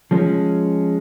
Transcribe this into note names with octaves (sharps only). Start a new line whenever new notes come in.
F3 G#3 C#4